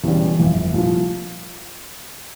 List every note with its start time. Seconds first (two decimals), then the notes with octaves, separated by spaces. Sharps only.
0.04 E1 E2 C#3 G3
0.39 G1 F2 E3
0.74 C2 A#2 F3